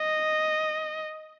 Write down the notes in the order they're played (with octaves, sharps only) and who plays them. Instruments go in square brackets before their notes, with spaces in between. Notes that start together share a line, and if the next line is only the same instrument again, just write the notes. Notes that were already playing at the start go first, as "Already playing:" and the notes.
Already playing: [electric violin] D#5